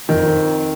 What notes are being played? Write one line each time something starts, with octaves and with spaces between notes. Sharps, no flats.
F2 D#3